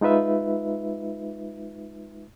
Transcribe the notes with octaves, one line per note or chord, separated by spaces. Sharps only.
G#3 D#4 F4 B4 E5